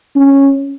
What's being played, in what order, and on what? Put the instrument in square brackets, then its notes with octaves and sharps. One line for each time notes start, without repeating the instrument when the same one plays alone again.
[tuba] C#4